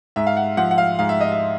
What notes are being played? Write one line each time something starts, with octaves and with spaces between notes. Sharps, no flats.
G#2 E5
F5
F#5
F3 F#5
F#5
F5
G#2 F5
E5
D#5
E5